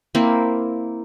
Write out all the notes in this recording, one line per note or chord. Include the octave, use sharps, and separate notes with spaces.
A#3 C4 E4